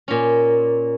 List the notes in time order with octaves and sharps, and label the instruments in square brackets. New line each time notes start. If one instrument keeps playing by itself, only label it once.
[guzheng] A#2 C#4